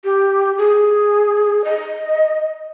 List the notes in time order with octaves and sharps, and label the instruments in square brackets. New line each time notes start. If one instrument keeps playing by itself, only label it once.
[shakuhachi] G4
G#4
D#5